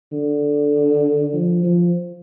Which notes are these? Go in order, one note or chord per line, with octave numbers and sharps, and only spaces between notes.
D3
F3
F3